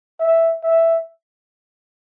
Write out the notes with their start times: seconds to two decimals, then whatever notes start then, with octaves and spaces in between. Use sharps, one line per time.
0.20 E5
0.63 E5